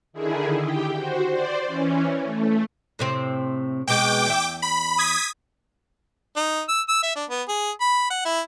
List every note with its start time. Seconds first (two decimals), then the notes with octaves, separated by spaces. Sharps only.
0.13 D3 D#3 E4 G#4
0.63 G4 G5
0.96 F#4 C5
1.31 C5 D5
1.67 E3 C#4
2.23 A3
2.99 A2 C3 C4
3.88 B2 G#3 G5 D6
4.26 E2 E5
4.62 B5
4.98 D#6 G#6 B6
6.36 D#4
6.69 E6
6.88 E6
7.03 E5
7.16 D4
7.30 B3
7.48 G#4
7.81 B5
8.10 F#5
8.25 E4